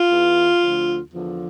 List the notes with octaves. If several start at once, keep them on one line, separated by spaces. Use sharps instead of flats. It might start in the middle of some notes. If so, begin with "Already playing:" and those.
Already playing: F4
E2 E3
D2 D3 F3
E2 D3 F3